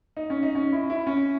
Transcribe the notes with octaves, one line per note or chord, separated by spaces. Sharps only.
D#4
C#4
D#4
C#4
E4
E4
C#4